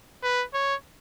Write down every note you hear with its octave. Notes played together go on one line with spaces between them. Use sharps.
B4
C#5